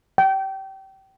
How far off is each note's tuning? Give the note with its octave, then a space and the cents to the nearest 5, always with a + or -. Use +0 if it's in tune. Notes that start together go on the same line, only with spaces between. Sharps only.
G5 -25